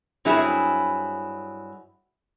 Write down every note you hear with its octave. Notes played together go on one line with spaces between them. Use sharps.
G2 F#3 C4 E4 G#4